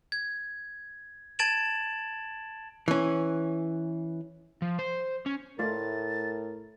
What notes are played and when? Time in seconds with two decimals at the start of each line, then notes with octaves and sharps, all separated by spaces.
0.12 G#6
1.39 A5 G#6 A6 D7 E7 F#7
2.88 E3 C#4
4.62 F3
4.79 C5
5.26 C#4
5.59 A2 A3 F4 A#4 D5 A6